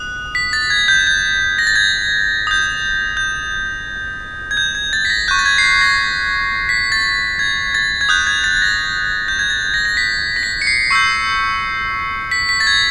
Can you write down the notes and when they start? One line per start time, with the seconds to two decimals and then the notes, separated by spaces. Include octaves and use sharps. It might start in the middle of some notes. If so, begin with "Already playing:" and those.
Already playing: D#6 F#6
0.35 B6
0.53 A6
0.70 G#6
0.88 G6
1.07 G6
1.58 A#6
1.67 A6
1.76 G#6
2.47 D#6 G6
3.17 G6
4.51 G#6
4.57 G6
4.75 G#6
4.93 A6
5.05 B6
5.10 A#6
5.28 C#6 F#6 G6
5.39 A6
5.46 G#6
5.58 C7
5.64 B6
5.81 A#6
6.69 B6
6.92 A6
7.39 G#6
7.75 A6
8.01 G#6
8.09 D#6 F#6 G6
8.27 G#6
8.44 A6
8.57 A6
8.62 A#6
9.28 G6
9.39 G#6
9.50 A6
9.74 A#6
9.85 A#6
9.97 B6
10.36 A#6
10.43 B6
10.62 C#7
10.67 C7
10.91 C#6 E6 G6 C7
12.31 B6
12.49 B6
12.60 A6
12.67 G#6